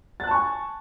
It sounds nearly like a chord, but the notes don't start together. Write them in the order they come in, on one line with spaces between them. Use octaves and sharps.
A6 F#6 A5 C#6 G#5